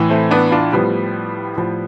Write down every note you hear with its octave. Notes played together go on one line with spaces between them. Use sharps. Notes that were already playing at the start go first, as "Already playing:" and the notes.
Already playing: A2 E3
A3 C4
B3 D4
D4 F4
A2 F3 G3 B3
A2 F3